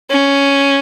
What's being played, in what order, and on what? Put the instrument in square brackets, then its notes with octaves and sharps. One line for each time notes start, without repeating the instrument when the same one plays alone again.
[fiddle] C#4